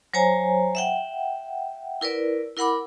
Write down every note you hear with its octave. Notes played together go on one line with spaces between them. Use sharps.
F#3 C5 C#5 G#5 A#5
E5 F#5 G5
E4 A#4 B4 D5
E4 A#4 F#5 B5 D6